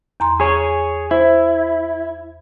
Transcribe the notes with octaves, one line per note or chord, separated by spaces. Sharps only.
E2 A#5 C6
G#4 C#5
E4 C5